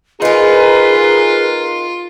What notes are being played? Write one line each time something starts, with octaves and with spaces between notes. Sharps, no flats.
D#4 F4 G#4 A#4 B4